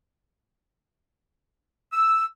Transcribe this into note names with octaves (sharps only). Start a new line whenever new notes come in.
E6